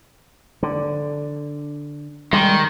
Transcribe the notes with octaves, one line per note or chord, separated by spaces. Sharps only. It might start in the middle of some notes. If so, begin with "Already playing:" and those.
D3
D#3 G3 G#3